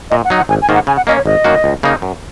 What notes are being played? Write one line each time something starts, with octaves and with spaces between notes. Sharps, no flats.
A#2 D#5
F#5
F#3 D#4
F#5
G#1 G#5
G#5
G#2 D#3 A#3
F#5
C#3 G#5
F#5
A#3 C#4 D#5
C#5
G#1 D#5
F#2 D#3 A#3 F#4
C#2
C#3 A#3 D#4
F#2